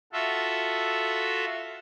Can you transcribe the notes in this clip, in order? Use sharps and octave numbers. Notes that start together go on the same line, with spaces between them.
F4 F#4 A4 E5